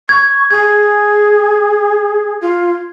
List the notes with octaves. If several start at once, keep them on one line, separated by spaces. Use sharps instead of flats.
C#6 G#6
G#4 G#6
F4